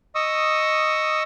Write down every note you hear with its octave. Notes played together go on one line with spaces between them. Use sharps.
D#5 C#6 D#6 E6